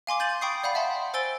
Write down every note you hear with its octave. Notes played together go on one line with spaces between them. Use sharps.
F5 G#5 C6 D6
G6 A6 D#7 F#7
G5 B5 C#6 D#6 G6 C7
D5 F5 F#5 B5
E5 F#5 A5 C6
C5 G#5 E6 A6 D7 G7